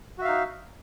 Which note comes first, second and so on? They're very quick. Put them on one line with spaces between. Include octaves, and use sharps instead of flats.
F#4 E5 F5 D#4